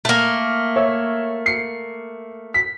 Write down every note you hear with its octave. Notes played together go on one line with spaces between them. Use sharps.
A3 A#3
C#5 E5
C7 C#7
B6